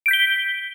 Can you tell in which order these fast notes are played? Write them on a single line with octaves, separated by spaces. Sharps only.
D7 G6 B6 G7